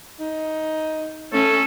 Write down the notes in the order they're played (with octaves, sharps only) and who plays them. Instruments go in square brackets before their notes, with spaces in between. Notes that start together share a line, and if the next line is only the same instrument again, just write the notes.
[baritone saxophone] D#4
[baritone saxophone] A3 [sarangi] C#4 [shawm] A4